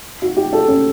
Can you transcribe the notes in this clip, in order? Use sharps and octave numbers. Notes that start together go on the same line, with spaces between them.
F#4
G4
A4
C#4